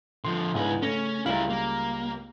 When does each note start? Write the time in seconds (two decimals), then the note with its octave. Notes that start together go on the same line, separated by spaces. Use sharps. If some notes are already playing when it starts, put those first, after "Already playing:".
0.25 D3 F3 C6
0.54 C#2 G#2 B3 D4 E4 G#4
0.82 C#3 A3 C#4 A#6
1.26 C#2 G3 E4 A#4 F5
1.50 A#3